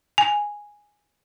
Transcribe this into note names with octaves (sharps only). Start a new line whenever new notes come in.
G#5